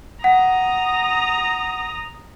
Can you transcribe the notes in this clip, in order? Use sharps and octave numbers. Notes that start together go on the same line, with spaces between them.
F#5 A#5 D#6